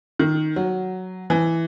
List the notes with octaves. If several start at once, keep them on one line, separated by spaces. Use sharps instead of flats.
D#3
F#3
E3